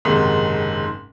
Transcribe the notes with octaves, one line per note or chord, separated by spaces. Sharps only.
F#1 G#2 C3 D#3